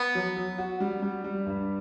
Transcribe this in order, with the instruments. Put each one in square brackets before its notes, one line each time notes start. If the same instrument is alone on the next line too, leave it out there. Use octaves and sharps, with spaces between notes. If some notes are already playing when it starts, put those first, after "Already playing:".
Already playing: [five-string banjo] B3
[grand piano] F#3
F#3
F#4
G3
G3
G3
G2